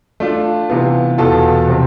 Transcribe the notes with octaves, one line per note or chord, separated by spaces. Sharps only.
A3 D4 F4
C3 E3 B3 F4
E2 B2 B3 F4 A4
C3 F3 C4